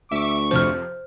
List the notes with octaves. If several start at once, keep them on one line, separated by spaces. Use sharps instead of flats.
D2 E5 C#6 D6
F2 C3 F3 C5 F6